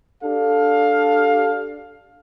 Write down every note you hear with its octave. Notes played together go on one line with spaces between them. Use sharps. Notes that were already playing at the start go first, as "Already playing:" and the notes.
D4 G4 A4 F5